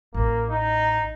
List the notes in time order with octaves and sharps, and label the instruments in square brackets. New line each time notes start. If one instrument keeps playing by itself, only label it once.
[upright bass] A1 [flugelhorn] A#3
[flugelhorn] D#4